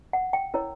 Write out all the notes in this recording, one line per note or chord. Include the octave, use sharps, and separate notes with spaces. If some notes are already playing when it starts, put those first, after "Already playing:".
F#5
G5
E4 A#4 C#5